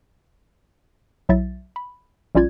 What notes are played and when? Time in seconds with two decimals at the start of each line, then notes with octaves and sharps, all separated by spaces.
1.29 B1 F#3 E4 E5 A6
1.76 B5
2.35 A#1 G3 C#4 F4 D5 G#6